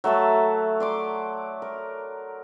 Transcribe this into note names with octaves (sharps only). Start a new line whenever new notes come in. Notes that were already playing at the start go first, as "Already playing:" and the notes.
F#3 A3 E5 A5
D5 C6 D6
A#4